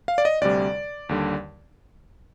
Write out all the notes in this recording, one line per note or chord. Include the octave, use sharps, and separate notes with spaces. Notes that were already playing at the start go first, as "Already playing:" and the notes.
F5
D5
D#5
D2 C3 G3 D5
D#2 D3 G3